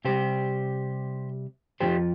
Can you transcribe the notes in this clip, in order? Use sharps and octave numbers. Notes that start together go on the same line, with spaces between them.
C3 G3 G4 C5
F2 C3 F3 G4 C5